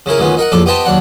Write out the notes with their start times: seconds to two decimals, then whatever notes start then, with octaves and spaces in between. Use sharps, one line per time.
0.06 C#3 C#4 E4 A#4
0.19 D2 A#2 D#3 B3 C#4
0.37 D#4 A#4 F#5
0.52 A#1 F2 A2 A4 D5
0.66 B3 G4 C5 D#5 G5 A5
0.85 D#2 F#3 D4 F#5